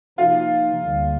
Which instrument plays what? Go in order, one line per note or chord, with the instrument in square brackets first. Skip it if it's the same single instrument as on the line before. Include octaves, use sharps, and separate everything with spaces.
[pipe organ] C3 F3 A#3 D#4 [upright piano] F4
[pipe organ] D2 D3 G3 A#3